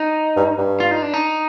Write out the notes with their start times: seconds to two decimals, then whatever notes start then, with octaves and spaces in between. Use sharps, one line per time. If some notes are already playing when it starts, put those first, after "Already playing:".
Already playing: D#4
0.36 G2
0.58 G2
0.80 F4
0.91 D#4
1.02 D4
1.13 D#4